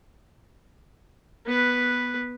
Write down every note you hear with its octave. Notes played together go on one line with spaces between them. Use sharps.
B3 B4